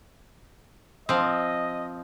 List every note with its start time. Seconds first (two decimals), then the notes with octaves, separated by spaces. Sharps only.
1.09 F3 C4 D#5